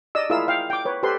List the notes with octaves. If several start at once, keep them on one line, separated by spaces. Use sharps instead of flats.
D5 D#5 E6
E4 F4 G#4 A#4 F5 E6
F5 G5
G5 D6
B4 C#5
G4 A4 B4 C5 C6